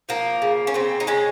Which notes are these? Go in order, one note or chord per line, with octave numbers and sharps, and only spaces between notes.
F3 A#3
C#3
C#4
C#3 C4
D#4
G#3 C#4